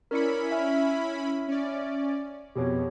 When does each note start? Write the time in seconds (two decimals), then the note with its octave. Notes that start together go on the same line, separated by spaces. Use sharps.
0.11 C#4 E4 A#4 D5 B5 C#7
0.51 E5 G#5 F6
1.48 C#4 D5
2.56 F2 B2 G4 G#4 C#5